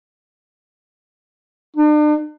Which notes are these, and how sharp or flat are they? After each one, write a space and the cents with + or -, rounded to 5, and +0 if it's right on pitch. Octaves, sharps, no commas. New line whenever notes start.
D4 +40